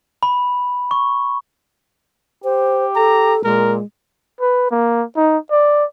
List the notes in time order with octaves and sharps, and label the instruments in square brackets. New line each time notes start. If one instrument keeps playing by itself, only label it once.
[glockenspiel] B5
C#6
[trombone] G4 [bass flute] C5
[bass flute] A4 [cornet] A#5
[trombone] A#2 [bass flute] G#3 [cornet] A#4
[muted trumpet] B4
A#3
D#4
D5